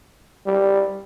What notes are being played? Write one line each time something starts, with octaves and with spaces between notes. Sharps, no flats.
G3